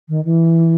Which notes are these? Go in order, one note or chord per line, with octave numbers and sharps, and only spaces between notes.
D#3
E3